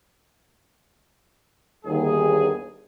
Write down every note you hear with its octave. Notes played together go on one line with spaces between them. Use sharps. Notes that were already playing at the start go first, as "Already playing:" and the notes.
G1 D#2 G#4